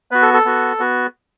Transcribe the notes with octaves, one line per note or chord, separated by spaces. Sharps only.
B3 F#4 B4
A4
A4
B3 F#4
B3 F#4